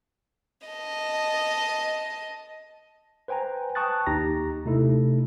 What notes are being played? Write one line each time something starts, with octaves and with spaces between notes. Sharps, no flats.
D#5 A5
B4 C5 G5 G#5 A#5
G5 A5 C#6 D#6 F#6 A6
D#2 D#4 G4 A#5 A#6
C3 A3 D#4 E4 A4